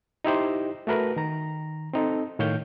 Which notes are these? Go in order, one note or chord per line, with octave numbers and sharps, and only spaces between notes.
D#4 E4 G4 C5
A3 F#4 A#4 B4
D#3 A#5
C4 D#4 A4 D#5
A2 D#3 C#5 F5 G6